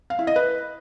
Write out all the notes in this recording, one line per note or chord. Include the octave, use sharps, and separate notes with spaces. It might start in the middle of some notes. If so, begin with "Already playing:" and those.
F5
E4
D#5
B4